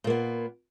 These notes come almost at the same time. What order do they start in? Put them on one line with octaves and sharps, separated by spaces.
A#2 A#3 B3